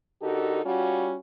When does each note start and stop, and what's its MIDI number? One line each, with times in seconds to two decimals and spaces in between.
0.22 0.63 50
0.22 0.63 63
0.22 0.63 66
0.22 0.63 67
0.22 0.63 69
0.22 0.63 70
0.64 1.16 55
0.64 1.16 61
0.64 1.16 65
0.64 1.16 66